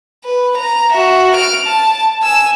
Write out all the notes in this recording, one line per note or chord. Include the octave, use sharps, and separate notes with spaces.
B4
A#5
F#4 E5
F6 D7
A5
G#5 E6